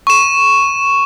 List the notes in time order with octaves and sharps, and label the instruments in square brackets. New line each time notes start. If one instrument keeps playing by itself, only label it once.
[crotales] C#6 E7